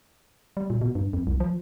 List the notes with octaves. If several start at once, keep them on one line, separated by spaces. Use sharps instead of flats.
G3
A#2
B2
G2
F2
C2
F3